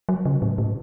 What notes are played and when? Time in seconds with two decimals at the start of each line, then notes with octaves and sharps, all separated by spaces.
0.09 F#3
0.25 C#3
0.42 A2
0.58 A2